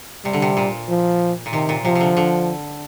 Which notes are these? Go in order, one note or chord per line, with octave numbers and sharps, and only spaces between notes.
C3 G3
D3
C3
A#2
F3
A#2
C3 D#3
A#2
C3 F3
C3
D3
D3